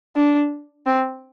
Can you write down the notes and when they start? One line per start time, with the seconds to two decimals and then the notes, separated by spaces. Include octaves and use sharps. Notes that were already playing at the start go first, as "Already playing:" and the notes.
0.16 D4
0.86 C4